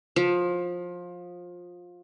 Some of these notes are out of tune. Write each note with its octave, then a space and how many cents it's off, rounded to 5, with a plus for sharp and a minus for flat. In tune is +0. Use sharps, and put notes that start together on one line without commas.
F3 +20